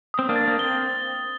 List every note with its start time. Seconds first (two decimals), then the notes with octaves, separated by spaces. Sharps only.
0.14 C4 D#6
0.29 A#3 D4
0.36 A6
0.48 A#3
0.59 C4 G7